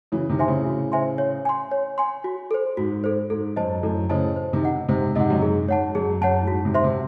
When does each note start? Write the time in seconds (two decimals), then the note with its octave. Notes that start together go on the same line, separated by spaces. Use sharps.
0.12 C#3 E3 F#4
0.29 C3 D#3
0.39 C5 E5 G#5 C6
0.47 A2 C#3
0.66 F#4
0.92 C5 E5 G#5 C6
1.18 C#5
1.45 G#5 C6
1.71 C#5
1.98 G#5 C6
2.24 F#4
2.51 A4 C5
2.77 G#2 F#4
3.04 A4 C5
3.30 G#2 A4
3.56 F#2 C5 D#5 A5
3.83 F#2 A2 A4
4.10 A2 C#3 C5 D#5 A5
4.36 C5
4.53 C3 D#3
4.63 D#5 F#5
4.88 G#2 C3 C5
5.15 G#2 C3 D#5 F#5
5.30 F#2
5.42 G#2 G#4
5.68 G#2 C#5 F#5 A5
5.95 F#2 G#4
6.21 F#2 C#5 F#5 A5
6.41 A2
6.48 G#2 F#4
6.65 G#2 C3
6.74 C5 E5 C6
6.84 C3